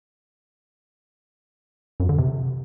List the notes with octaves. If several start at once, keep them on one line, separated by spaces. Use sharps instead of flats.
F#2
D3
C3